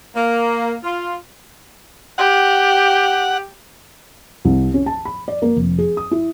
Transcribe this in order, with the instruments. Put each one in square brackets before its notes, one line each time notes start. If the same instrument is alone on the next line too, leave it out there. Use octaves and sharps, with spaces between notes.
[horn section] A#3
F4
[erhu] G4 [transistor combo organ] F#5
[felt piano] C2
C#4
A5
B5
D5
A#3
F1
G#4
D#6
E4